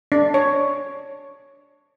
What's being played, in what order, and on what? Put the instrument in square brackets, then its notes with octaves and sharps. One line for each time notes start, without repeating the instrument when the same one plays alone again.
[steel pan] D4
C#5